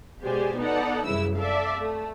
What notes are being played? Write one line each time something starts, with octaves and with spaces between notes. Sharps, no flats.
B2 G#3 G4 C5 D5 G#5
B3 D#4 A4 D5 F#5
C2 F#2 C#3 E3 E4 E6
A4 D5 E5 F5
A3